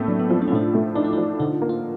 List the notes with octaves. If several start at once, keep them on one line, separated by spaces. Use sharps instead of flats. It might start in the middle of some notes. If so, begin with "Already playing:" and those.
Already playing: A2 A3 A#3 C4 C#4
F#3 D4
B3
F3 C4
D4
C#4
A2 D4
A3
D4 D#4
E4
F3 D#4
D3 D#4
A#3
F4